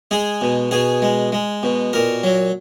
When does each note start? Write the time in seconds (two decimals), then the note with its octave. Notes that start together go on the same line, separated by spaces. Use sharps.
0.11 G#3 G#4
0.41 B2
0.71 B2 G#4
1.02 G#3
1.32 G#3
1.63 B2
1.93 A#2 A#4
2.23 F#3